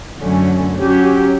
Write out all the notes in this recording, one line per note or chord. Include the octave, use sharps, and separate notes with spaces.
F#2 D3 F#3 A3 C#4
F#3 C#4 G4